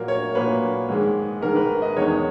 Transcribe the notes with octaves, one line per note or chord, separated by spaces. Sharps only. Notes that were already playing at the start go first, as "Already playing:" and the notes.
Already playing: A#2 F#3 A#3 A#4
C#5
A#2 F#3 A#3 B4
G#2 D#3 G#3
G#2 D#3 G#3 A#4
B4
D#5
E2 D#3 G#3 C#5